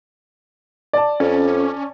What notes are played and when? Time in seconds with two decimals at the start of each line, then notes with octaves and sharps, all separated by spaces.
0.93 D5 A5
1.20 F2 C#4